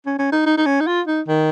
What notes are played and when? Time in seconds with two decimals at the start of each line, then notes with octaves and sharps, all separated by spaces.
0.06 C#4
0.19 C#4
0.32 D#4
0.46 D#4
0.57 D#4
0.66 C#4
0.80 D#4
0.87 F4
1.07 D#4
1.28 D#3